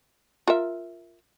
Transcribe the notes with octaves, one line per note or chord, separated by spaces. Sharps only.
F4 A#4 E5